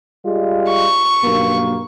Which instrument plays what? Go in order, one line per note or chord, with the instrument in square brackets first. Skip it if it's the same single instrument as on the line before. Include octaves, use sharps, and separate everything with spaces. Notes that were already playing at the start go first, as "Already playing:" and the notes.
[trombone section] G3 G#3 F4
[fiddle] C#6
[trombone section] B1 G2 A#3